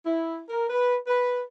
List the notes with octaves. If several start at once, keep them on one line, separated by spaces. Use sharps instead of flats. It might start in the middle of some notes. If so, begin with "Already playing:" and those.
E4
A#4
B4
B4